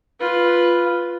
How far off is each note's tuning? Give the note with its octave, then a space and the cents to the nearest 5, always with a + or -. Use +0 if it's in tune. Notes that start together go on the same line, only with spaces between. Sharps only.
F4 +0 B4 +0